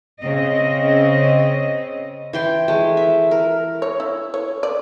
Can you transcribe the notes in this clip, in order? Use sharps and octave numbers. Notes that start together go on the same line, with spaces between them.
C#3 C4 D#5
E3 G5 C6
G#3 A3
E5
A#4
C#5
E4
C#5
D5